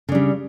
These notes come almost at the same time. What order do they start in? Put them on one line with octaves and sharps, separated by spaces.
C#3 D4 G3